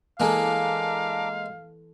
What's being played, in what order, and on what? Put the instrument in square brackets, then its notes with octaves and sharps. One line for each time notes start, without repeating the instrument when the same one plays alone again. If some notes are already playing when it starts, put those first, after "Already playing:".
[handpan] E3 A4 [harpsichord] G#3 A#3 [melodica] D4 A#5 D6 [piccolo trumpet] F5